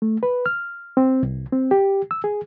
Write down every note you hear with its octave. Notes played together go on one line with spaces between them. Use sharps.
A3
B4
F6
C4
C2
C4
G4
E6
G#4